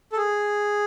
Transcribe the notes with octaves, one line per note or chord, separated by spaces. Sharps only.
A4
G#4